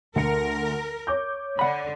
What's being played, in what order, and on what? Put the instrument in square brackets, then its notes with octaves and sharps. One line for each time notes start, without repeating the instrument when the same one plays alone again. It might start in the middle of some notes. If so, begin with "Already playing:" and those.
[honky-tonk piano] D2 C#7 [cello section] A#4
[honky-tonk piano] C#5 D6 G6
[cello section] D3 [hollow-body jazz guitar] F#5 B5